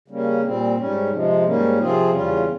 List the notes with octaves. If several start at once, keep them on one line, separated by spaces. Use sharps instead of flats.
C#3 G3 A#3 C#4
A#2 G3 C4
G#2 G3 C#4
C3 F3 G#3
G#2 G3 A#3 C#4
C3 F3 C4 F4 G#4
E2 C#3 G3 C#4 F4